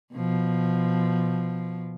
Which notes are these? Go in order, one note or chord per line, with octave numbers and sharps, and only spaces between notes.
B2 F3